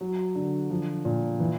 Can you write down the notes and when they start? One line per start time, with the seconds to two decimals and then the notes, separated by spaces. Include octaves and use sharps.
0.01 F#3
0.35 D3
0.70 F3
1.05 A#2
1.40 E3